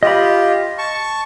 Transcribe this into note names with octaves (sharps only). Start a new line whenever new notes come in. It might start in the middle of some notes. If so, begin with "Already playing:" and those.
F4 G4 D#5 B5
A5 C#6